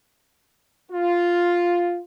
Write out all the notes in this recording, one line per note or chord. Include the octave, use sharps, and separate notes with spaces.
F4